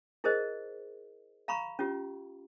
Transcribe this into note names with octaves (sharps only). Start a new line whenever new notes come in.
E4 G#4 A#4 C5 D#5
F5 A#5 B5 C#6
C#4 F4 G4